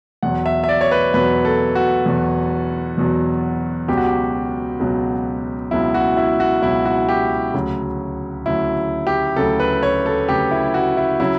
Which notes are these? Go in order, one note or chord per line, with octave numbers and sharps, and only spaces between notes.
E2 B2 F#3 F#5
E5
E5
D5
C#5
B4
E2 B2 F#3 B4
A4
F#4
E2 B2 F#3
E2 B2 F#3
C#2 B2 F#3 G4
F#4
G4
C#2 B2 F#3
C#2 B2 F#3 E4
F#4
E4
F#4
C#2 B2 F#3 E4
F#4
G4
D2 C#3 F#3
D2 C#3 F#3 E4
G4
D2 C#3 F#3 A4
B4
C#5
A4
D2 C#3 F#3 G4
E4
F#4
E4
C#3 F#3 E4